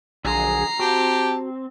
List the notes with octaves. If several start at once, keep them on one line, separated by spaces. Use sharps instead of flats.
A#1 D3 F#3 G#4 A#5 C7
C4 F#4 G4 A5